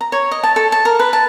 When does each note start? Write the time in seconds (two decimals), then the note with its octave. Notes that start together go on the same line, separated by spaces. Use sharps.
0.01 A#5
0.12 C#5
0.31 D#5
0.43 A5
0.56 A4
0.72 A5
0.85 A#4
0.99 B4
1.13 A5